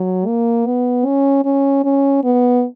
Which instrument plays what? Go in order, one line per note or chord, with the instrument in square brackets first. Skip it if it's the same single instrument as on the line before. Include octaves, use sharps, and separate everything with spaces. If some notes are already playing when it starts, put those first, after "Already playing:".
Already playing: [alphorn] F#3
A#3
B3
C#4
C#4
C#4
B3